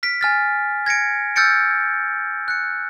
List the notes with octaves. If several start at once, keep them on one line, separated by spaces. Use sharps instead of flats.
F6 B6 D7
G#5 F6 A6
G#6 A#6 C#7 D7
E6 F6 G6 A6 C#7 D7
F#6 C#7